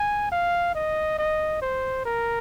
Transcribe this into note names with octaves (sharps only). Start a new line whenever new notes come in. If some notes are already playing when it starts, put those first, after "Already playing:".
Already playing: G#5
F5
D#5
D#5
C5
A#4